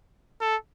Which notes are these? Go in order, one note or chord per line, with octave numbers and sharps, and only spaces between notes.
A4